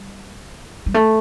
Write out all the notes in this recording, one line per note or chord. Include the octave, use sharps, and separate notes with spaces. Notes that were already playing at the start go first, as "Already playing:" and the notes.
Already playing: G3
G3
A3